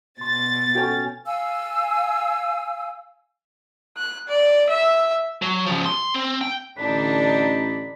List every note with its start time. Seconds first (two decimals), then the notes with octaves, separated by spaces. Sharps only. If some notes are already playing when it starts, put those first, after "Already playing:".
0.21 B2 C6 A6
0.75 C#4 F#4 A4 C#5 G5
1.26 F5 G#5 E6
3.97 F#6
4.28 D5
4.69 E5
5.42 F#3
5.66 C#3 F3
5.86 C6
6.14 C4
6.41 G5
6.78 A1 D3 D4 D#4 B5